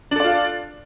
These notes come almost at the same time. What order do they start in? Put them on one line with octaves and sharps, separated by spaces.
D4 A4 D5 F4